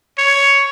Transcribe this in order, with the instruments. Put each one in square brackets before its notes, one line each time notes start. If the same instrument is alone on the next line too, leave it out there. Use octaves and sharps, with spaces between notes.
[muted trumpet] C#5